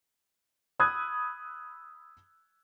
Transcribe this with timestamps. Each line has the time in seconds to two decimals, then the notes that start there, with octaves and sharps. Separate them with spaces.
0.79 B5 D#6 E6 F#6 G#6